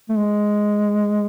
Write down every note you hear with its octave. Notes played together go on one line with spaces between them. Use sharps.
A3
G#3